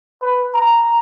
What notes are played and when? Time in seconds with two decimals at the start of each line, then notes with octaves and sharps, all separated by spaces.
0.22 B4
0.55 A#5